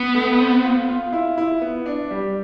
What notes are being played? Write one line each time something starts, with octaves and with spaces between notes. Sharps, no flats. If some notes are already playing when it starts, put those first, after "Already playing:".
Already playing: B3
A3
C4
F4
F4
E4
E4
B3
D4
G3